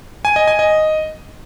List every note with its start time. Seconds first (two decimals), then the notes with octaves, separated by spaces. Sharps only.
0.25 G#5
0.36 D#5
0.48 G#5
0.59 D#5